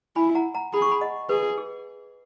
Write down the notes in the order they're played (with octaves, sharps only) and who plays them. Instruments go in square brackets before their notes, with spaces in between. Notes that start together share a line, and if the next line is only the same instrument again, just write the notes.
[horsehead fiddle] E4 [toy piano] G#5 B5
[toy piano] F#5 A#5
F#5 A#5
[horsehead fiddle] G#4 [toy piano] B5
[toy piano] C#6
G#5 B5
D#5 F#5
[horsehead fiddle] G#4 [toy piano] B4
[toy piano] G#4